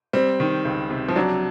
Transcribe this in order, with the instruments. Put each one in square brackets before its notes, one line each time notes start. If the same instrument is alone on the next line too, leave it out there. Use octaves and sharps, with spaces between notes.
[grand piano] G3 [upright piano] C4
[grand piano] D#3
C#2
C3
[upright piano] F3
[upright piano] F#3 [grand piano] D4